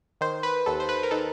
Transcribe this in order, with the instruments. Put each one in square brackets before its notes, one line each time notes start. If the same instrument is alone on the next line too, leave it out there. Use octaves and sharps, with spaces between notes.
[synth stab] D#3 C5
B4
D#2 A4
C5
B4
A#4
D#3 A4